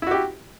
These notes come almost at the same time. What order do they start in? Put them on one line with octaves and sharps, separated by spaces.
E4 F#4 G4